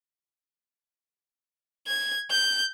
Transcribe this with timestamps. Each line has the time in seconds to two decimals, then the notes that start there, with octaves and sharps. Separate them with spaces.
1.87 G#6
2.30 G6